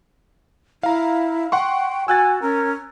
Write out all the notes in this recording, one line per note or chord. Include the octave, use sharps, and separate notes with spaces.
E4 F5 A#5
F#5 G5 C6 C#6
F#4 G#5 E6 F#6 A6
C#4 A#4